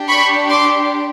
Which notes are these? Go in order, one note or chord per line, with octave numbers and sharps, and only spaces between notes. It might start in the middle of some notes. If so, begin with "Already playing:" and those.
Already playing: D4 G4
B5 C#6
C6 D6